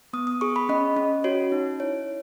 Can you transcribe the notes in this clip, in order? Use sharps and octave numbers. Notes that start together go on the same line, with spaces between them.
B3 D#6
D#6
G#4 C#6
B5
C#4 D#5
C#4
F#4 C#5
D#4
E4 C#5